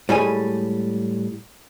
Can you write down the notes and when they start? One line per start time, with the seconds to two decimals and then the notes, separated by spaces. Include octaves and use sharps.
0.09 A2 G3 G#3 G#5